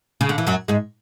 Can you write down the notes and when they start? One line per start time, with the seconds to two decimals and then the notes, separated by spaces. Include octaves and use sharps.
0.21 C#3
0.29 D3
0.38 E3
0.47 F#2 F#3
0.68 G#2 G#3